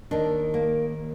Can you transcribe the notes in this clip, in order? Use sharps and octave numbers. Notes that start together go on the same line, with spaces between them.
D#2 D#3 D4
A#3